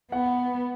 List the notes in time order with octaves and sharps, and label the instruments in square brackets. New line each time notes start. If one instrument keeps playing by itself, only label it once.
[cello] B3 [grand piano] F#5